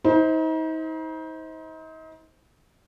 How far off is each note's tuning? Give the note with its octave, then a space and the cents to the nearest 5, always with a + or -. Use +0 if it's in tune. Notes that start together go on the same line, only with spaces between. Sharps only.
D#4 +40 C5 +0